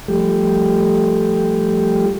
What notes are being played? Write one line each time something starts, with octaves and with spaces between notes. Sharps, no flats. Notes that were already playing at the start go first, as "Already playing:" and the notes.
F3 G3 A3 G4